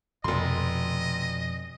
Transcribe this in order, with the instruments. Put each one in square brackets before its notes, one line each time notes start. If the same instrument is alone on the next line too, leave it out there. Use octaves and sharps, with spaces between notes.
[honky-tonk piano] F1 C6 [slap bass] F2 B2 D3 [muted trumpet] D#5